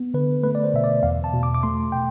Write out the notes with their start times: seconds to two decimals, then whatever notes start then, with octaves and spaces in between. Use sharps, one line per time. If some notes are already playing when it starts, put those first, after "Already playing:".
Already playing: B3
0.14 D3 B4
0.43 A3 B4
0.55 D5
0.64 C5
0.74 B2 E5
0.84 D5
1.03 E2 F5
1.24 A5
1.33 B2
1.43 D6
1.54 D6
1.63 A3 C6
1.92 B2 G5